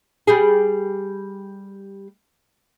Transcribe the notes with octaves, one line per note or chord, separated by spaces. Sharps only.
G3 G4 G#4